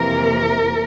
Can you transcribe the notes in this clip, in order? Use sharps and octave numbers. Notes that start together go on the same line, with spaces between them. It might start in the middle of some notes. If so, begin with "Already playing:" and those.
Already playing: F2 C3 E3 A#3 A#4